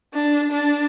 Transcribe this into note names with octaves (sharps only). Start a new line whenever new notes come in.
D4
D4